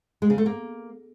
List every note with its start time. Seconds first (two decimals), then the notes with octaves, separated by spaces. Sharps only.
0.22 G#3
0.30 C#3
0.38 A3
0.46 A#3